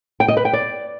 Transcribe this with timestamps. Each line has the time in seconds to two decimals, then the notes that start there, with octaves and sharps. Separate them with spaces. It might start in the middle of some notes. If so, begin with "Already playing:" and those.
0.20 G5
0.28 D#5
0.37 B4
0.45 G5
0.53 D5